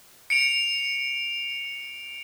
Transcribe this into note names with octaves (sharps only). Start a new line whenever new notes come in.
C#7 D7 F7